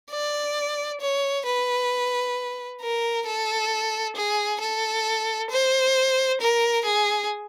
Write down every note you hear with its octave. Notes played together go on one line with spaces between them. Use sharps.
D5
C#5
B4
A#4
A4
G#4
A4
C5
A#4
G#4